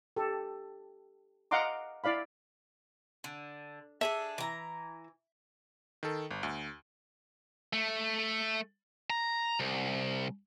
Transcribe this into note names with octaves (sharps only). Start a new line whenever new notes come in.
G4 A4
D#5 F5 F#5 A#5 C6 D6
E4 D5 F5 B5
D3
D4 G#4 A4 E5
E3 A#5
D#3 A4
G1
D2
A3
A#5
C2